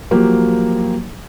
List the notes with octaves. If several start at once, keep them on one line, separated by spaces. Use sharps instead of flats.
F3 F#3 A#3 G4